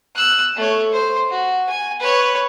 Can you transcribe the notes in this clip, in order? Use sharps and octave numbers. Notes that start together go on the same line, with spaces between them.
E6 F#6
A3 C#5
C5
F#4
G#5
B4 C#5